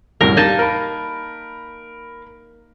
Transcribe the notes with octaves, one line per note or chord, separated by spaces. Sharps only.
C2 F#2 A2 A#4
G3 A#3 D#4 A5
A#4 B5